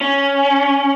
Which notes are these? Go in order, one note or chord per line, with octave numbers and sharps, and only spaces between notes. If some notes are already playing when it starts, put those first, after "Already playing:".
C#4